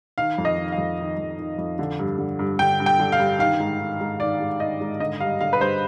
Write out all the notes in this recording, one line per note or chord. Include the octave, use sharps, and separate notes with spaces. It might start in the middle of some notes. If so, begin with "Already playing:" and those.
D#3 F5
F2
D#5
D#3
F5
F2
D#3
F2
D#3
F2
D3
G2
D3
G2
D3 G5
G2
G5
D3
F5
G2
D#3 F5
G#2
D#3
G#2
D#3 D5
G#2
D#3 D#5
G#2
D3 D#5
G2 F5
D3 F5
B4
G2 C5